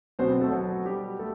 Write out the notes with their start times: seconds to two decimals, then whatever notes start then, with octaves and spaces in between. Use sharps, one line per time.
0.19 B2 F#3 B3 C4 C5
0.30 C4 C5
0.41 A3 A4
0.52 F#3 F#4
0.85 G3 G4
1.19 A3 A4